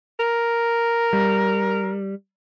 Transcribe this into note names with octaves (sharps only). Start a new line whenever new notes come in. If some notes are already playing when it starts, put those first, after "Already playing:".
A#4
G3